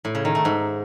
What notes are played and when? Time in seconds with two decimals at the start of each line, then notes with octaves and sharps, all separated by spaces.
0.05 A2
0.15 C#3
0.25 D#3
0.35 A3
0.45 G#2